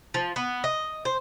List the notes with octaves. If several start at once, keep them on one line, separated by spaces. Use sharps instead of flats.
F3
B3
D#5
C5